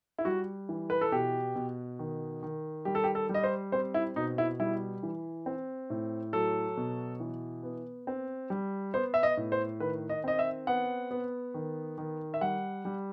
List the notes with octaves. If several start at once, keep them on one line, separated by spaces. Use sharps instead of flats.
E4
G3 F#4
E3
B4
A4
B2 G4
B2
D#3
D#3
G3 G4
A4
G4
A4
G3
D#5
C5
C4 C5
E4
B2 D#4
E4
G3 E4
E3
C4
A2
F#3 A4
B2
E3
B3
C4
G3
B3 C5
E5
D#5
A2
C5
D#3 B4
D#5
C4 D#5
E5
B3 F#5
B3
D#3
D#3
E5
G3 F#5
G3